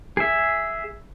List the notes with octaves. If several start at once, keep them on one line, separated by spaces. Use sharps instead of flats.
G#4 E5